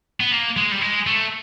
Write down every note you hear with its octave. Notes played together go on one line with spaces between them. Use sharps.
B3
A#3
G#3
G3
G#3
A3